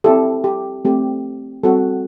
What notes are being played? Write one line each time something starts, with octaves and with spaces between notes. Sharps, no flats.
C4 E4 G4 A4
G4
A3 C4 G4
G3 C4 F#4 A4